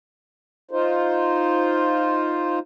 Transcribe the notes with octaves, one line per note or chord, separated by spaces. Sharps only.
D#4 F4 C5